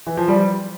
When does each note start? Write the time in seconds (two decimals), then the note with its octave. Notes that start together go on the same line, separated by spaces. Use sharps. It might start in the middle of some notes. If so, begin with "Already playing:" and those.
0.07 E3
0.17 F3
0.28 G3